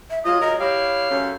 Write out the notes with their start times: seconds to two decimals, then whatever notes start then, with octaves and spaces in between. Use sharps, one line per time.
0.10 E5
0.25 F#3 G#3 F4 D#5
0.41 A#4 D#5
0.60 E4 G4 C#5 F5
1.10 F#2 A3 C#4